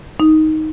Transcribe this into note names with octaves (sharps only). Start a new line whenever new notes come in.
D#4